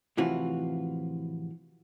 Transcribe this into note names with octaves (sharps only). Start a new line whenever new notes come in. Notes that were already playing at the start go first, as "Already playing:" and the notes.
A2 C3 E3 F3 F4 F#4